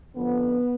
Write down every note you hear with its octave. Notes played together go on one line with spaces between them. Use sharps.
F2 D3 F3 B3